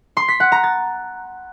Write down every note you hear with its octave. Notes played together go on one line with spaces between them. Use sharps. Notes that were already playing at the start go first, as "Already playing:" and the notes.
C6
B6
F#5
A#5
A6